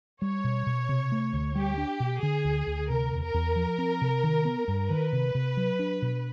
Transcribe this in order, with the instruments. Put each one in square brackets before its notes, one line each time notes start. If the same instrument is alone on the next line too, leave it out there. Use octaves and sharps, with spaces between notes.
[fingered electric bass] G3 [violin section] C#5
[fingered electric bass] B2
B2
C3
A3
D2
[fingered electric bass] G3 [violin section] G4
[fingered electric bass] D4
B2
[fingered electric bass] D3 [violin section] G#4
[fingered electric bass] D2
D2
[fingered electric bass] C3 [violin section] A#4
[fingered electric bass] E2
[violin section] A#4
[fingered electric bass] E2
F3
C4
C3
D#3
B3
G2
[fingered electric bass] D#3 [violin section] B4
[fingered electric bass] C3
C3
F#3
D4
B2